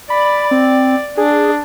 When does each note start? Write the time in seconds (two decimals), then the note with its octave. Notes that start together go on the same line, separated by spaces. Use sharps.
0.10 D5 B5
0.51 C4
1.17 D4 G#4